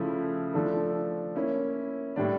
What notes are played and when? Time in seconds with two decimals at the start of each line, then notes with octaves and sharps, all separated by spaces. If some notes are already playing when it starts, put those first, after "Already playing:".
Already playing: C#3 F3 A3 E4
0.54 F3 A3 D4 A4
1.35 A#3 C#4 E4
2.16 A2 G3 D4